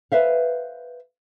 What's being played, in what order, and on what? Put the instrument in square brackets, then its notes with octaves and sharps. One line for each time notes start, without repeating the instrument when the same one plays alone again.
[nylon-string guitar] B4 C5 E5 F5